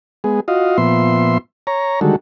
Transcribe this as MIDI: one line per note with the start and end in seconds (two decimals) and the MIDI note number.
0.24 0.40 56
0.24 0.40 59
0.24 0.40 68
0.48 0.77 65
0.48 0.77 66
0.48 0.77 75
0.48 0.77 77
0.78 1.38 46
0.78 1.38 53
0.78 1.38 59
0.78 1.38 76
0.78 1.38 84
1.67 2.00 73
1.67 2.00 82
2.01 2.16 50
2.01 2.16 51
2.01 2.16 55
2.01 2.16 56
2.01 2.16 66
2.01 2.16 69